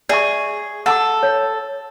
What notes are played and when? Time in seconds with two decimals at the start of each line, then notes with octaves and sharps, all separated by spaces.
0.09 G#4 D5 E5 C#6
0.86 A4 F#5 A5 D6
1.23 C#5